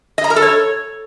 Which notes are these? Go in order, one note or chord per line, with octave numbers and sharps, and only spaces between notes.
D#5
A#5
A#4
A4
C#5